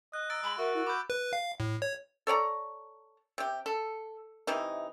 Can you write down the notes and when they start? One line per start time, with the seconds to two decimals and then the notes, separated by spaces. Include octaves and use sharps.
0.13 D#5 F#6
0.30 A#5 E6 A6 D7
0.43 G#3 B5
0.57 F#4 A#4 E5
0.74 E4
0.87 B5 D6 G6
1.10 B4
1.33 F5
1.60 A2
1.82 C#5
2.27 A4 C#5 D5 A#5
3.38 C3 G4
3.66 A4
4.47 C3 E3 D#4